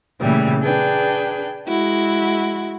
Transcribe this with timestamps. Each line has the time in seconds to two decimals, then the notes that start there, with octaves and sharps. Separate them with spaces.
0.20 A#2 C#3 E3 G3 A3
0.61 D4 G#4 B4 G5
1.67 G#3 E4 F#4